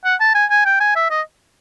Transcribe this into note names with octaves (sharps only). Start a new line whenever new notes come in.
F#5
A5
G#5
G#5
G5
G#5
E5
D#5